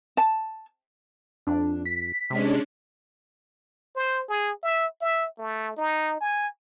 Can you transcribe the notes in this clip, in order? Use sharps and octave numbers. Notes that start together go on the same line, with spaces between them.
A5
F2 D4
B6
C3 G#3 C#4 D4
C5
G#4
E5
E5
A3
D#4
G#5